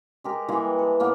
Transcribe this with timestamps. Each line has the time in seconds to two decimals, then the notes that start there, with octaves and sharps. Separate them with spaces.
0.24 G#3 G4 A#4
0.49 E3 G3 G#3 A#3
0.79 A4
1.00 A2 A#3 B3